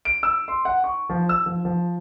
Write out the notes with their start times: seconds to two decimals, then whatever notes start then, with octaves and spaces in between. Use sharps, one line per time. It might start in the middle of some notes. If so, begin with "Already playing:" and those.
0.05 D7
0.23 E6
0.48 C6
0.65 F#5
0.84 C#6
1.09 F3
1.29 E6
1.46 F3
1.65 F3